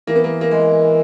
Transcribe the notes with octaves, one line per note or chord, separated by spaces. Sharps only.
E3 A#3
B3
A#3
A#3
G#3